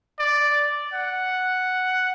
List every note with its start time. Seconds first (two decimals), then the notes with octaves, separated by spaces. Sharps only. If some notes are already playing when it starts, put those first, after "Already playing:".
0.19 D5
0.93 F#5